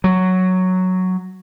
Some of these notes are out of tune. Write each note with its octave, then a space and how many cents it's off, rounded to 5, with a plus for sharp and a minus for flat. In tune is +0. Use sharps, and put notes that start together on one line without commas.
F#3 +0